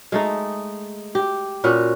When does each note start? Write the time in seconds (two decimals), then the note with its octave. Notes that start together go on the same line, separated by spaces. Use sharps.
0.12 G#3 A3 D#4
1.15 G4
1.64 A#2 C#4 F#4 B4